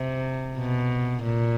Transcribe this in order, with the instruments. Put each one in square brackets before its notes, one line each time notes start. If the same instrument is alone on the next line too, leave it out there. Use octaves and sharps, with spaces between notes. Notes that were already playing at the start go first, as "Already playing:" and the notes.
Already playing: [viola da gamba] C3
B2
A#2